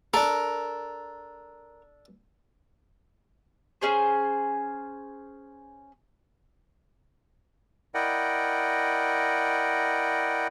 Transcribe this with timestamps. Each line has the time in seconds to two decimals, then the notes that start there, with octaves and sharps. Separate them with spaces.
0.14 D4 A4 A#4
3.81 C#4 G#4 C5
7.94 E4 A#4 D5 D#5 F#5 G5